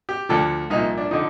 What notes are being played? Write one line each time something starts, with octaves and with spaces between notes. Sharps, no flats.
G4
D2 D3 F3 A4
C2 A#2 F3 D#4
D4
D3 F3 D#4